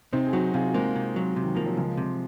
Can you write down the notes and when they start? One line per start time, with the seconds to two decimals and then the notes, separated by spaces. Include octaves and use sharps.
0.13 C3 C4 D#4
0.27 G#4
0.33 F#3 D#4 F#4
0.54 C3 F4 G#4
0.74 G#3 A#3 C4
0.96 C3
1.16 F#3
1.36 C3
1.44 D#3
1.55 F3 A#3
1.66 F#3
1.77 C#2 F3 G#3
1.98 C3